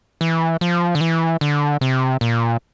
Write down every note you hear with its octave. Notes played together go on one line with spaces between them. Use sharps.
E3
F3
D3
E3
D3
C3
A#2